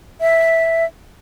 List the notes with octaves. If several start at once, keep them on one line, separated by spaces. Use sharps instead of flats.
E5